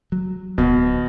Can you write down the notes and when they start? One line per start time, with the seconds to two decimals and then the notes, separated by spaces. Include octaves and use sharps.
0.12 F#3
0.58 D1 B2 B3